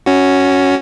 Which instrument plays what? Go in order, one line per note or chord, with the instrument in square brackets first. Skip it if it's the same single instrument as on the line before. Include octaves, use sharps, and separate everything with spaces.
[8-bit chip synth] C#4 F#4